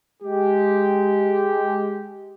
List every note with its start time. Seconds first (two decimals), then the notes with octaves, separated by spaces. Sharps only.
0.23 G#3 G4